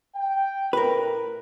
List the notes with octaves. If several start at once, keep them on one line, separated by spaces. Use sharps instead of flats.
G5
A2 A#4 B4